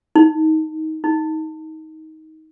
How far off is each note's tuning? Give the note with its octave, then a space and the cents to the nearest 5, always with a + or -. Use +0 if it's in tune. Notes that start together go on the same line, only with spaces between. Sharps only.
D#4 +10
D#4 +20